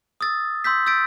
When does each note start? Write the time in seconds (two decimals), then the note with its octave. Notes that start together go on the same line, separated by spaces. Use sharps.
0.21 D#6 E6 A6
0.64 C6 E6 G6 B6
0.86 E6 G6 A6 B6 D7